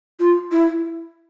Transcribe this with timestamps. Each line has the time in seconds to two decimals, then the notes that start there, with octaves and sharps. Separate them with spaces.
0.20 F4
0.52 E4